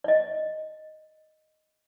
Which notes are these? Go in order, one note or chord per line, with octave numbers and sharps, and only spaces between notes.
D5 D#5